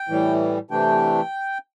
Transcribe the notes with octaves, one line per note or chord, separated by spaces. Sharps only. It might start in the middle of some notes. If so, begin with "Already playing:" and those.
Already playing: G5
A2 E3 G3
C3 E3 A3 D4 G5